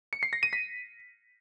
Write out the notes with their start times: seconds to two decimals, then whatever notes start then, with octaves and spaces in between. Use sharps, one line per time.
0.13 C#7
0.23 C7
0.33 A#6
0.43 D#7
0.53 B6